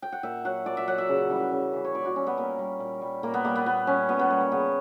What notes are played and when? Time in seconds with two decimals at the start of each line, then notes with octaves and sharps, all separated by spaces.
0.02 G5
0.12 F#5
0.23 A#2 E5
0.45 F#3 F#5
0.66 A#2 D5
0.77 E5
0.87 F#3 F#5
0.98 E5
1.09 C#3
1.30 E3 G3
1.52 C#3
1.73 E3 G3
1.85 C#5
1.95 A#2 D5
2.05 F#4
2.16 G3 C#4
2.27 B3
2.37 A#2 A#3
2.59 G3
2.80 A#2
3.01 G3
3.23 A#2 A#3
3.34 B3
3.45 G3 A#3
3.55 B3
3.66 A#2 B3
3.87 G3 C#4
4.09 A#2 B3
4.19 B3
4.30 G3 A#3
4.41 A#3
4.52 C#3 B3